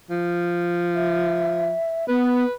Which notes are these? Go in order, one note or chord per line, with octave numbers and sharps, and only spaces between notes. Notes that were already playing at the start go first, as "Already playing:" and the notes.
F3
E5
B3 B4